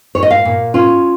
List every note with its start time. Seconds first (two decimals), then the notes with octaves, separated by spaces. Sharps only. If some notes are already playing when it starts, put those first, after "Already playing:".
0.15 A#2 C#5
0.23 D#5
0.30 F5
0.45 A#2
0.74 C#4 F4